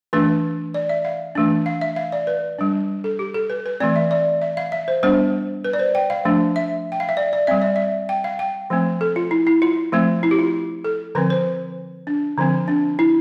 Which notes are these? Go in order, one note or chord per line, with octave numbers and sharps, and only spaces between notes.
E3 A3 D4 B4
D5
E5
F5
E3 A3 D4
F5
E5
F5
D5
B4
G3 D4
A4
G4
A4
B4
B4
E3 A3 C4 D5
E5
D5
E5
F5
E5
C5
G3 B3 D4 C5
B4
D5
C5
G5
F5
F3 A3 D4
E5
G5
F5
E5
D5
D5
G3 C4 E5
D5
E5
G5
F5
G5
F3 A3 C4
A4
F4
E4
E4
F4
F3 A3 C4
E4
G4
F4
A4
D3 F3 C4 B4
C5
D4
D3 F3 C4
D4
E4